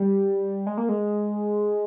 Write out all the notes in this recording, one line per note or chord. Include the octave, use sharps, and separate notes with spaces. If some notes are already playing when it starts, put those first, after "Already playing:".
Already playing: G3
G#3
A#3
G#3